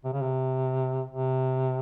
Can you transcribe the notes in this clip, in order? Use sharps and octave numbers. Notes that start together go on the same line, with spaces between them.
C3
C#3
C3
C3